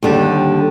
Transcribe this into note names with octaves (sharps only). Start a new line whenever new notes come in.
D#2 D3 G3